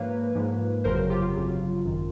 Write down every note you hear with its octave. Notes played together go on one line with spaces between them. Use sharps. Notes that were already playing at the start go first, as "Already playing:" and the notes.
Already playing: G#2 F3 A#3 B4 C#5
G#2 F3 A#3
G1 F2 C#3 F#3 A#4 C5
F4 G4
F4
G1 F2 C#3 F#3
G#1 F#2 D#3